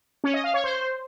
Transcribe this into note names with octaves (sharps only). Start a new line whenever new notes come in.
C#4
D#5
F5
C#5
C5